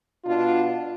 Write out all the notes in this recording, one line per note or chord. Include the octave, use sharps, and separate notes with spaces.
B2 D4 F4